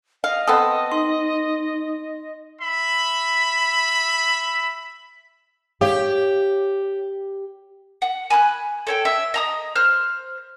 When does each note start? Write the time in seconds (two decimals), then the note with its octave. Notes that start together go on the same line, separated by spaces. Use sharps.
0.24 D#5 F5
0.48 B3 C4 A4 D#6
0.92 D#4 C6
2.62 E5 B5
5.81 G4 C#5 F5
8.02 F#5
8.30 G#5 B5 D#6 F#6
8.87 A4 C#5 G5
9.05 E5
9.34 D#5 A#5 D#6
9.76 C5 F6 F#6